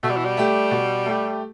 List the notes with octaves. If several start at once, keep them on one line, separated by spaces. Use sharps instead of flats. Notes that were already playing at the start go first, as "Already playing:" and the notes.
B2 A3
G3
E3
G3
A3 G4
B2
A3 G4